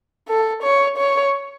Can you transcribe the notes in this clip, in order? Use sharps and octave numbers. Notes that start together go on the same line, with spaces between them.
A4
C#5
C#5